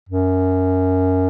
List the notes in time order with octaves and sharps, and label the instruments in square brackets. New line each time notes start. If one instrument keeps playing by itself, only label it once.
[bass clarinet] F#2